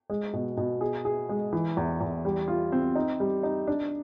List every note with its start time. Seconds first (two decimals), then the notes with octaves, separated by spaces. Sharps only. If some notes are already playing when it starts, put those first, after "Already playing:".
0.10 G#3
0.33 B2
0.57 B2
0.81 G#4
1.05 G#4
1.29 G#3
1.53 E3
1.77 E2
2.01 E2
2.25 G3
2.48 F4
2.72 C4
2.95 D#4
3.20 G3
3.43 D#4
3.67 D4